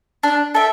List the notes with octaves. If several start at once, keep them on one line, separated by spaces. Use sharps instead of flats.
D4
A4 E5 G5